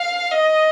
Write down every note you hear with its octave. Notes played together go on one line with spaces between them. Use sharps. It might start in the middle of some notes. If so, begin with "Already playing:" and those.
Already playing: F5
D#5